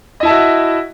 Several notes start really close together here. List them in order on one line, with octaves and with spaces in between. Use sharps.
D#5 E4 A5 E5 F#4